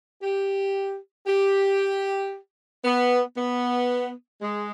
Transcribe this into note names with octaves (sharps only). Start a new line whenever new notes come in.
G4
G4
B3
B3
G#3